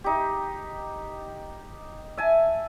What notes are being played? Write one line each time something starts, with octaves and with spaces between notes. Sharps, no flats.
D#4 G4
E5 G#5 A5